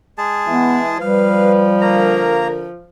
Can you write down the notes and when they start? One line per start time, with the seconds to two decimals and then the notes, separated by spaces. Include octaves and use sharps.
0.18 G#3 G#4 A5
0.47 E3 B3 E4
1.01 F3 G3 B4 F5
1.81 D3 A#3 A#4 A#5